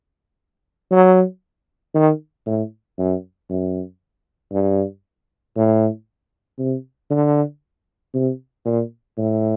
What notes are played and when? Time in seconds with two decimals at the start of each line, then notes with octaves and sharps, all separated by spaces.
0.92 F#3
1.95 D#3
2.46 A2
2.98 F#2
3.50 F#2
4.53 G2
5.56 A2
6.59 C3
7.11 D3
8.14 C3
8.65 A#2
9.17 A2